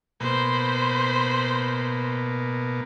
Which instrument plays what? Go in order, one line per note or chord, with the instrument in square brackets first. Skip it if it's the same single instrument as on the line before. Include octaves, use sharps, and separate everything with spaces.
[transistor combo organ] B2 A#3 [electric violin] C5 B5